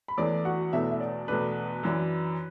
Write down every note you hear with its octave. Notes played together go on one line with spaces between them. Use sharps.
B5
E2 E3 A3 D4 D5 D6
F#4 F#5
E2 B2 A3 D4 E4 E5
E5
D5
E2 B2 A3 D4 B4
F#2 E3 D4